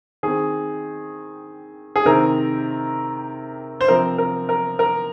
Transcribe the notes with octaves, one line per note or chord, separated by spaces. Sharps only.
D#3 C4 G#4
G#4
C3 D#3 C4 A#4
C5
C3 F3 C4 A#4
A#4
A#4
A#4